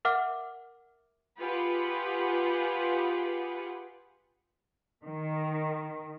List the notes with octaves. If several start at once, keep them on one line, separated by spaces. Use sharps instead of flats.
A#4 E5 F#5 D6 F6
F4 G4 G#4 B4 F#5
D#3